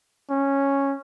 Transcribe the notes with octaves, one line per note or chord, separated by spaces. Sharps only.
C#4